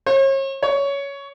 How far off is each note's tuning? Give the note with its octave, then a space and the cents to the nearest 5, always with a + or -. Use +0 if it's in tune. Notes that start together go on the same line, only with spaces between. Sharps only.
C#5 -40
C#5 +15